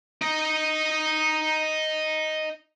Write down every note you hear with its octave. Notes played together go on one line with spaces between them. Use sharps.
D#4 D#5